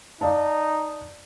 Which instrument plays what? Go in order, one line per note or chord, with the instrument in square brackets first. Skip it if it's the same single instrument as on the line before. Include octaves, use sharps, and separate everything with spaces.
[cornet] D#4 [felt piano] D5 F5 A5